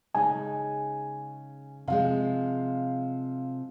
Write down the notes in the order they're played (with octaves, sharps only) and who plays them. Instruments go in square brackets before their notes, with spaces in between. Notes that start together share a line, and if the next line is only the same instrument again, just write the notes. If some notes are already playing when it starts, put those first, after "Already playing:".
[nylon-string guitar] C#3 G#3 D#4 [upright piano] G#5
[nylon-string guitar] C3 F3 G#3 [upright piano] F5